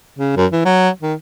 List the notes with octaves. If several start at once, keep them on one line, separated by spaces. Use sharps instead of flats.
C#3
F#2
E3
F#3
D#3